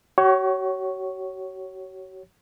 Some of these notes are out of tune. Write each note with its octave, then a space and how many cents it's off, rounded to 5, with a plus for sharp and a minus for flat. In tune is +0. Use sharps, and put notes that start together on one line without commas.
F#4 +40 C#5 +0